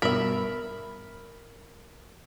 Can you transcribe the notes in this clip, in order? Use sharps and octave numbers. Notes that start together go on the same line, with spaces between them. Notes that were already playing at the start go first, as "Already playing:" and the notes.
G2 B2 A#4 E5 B5